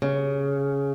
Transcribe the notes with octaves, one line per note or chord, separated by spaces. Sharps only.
C#3